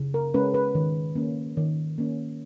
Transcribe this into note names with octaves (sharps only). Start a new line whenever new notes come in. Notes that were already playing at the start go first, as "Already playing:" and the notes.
Already playing: C#3
A#4
G#3 C#4 B4
B4
D#3
A#3 C#4
D#3
A#3 C#4